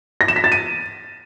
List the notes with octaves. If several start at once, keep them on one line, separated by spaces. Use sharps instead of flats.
A#6
E7
B6
A6
D#7